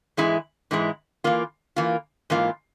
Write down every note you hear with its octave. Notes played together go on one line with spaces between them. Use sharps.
G#2 E3 G#3 E4
G#2 E3 G#3 E4
E3 A#3 F4
E3 A#3 F4
G#2 E3 A#3 F4